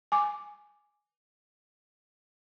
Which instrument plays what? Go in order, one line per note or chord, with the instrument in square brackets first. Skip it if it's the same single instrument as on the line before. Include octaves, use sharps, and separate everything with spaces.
[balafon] G#5 D6